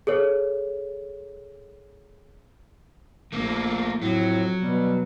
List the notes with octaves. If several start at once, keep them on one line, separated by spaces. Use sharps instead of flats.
G#4 A4 C#5
A#1 A3 A#3
F2 A2 F#3
B2 G3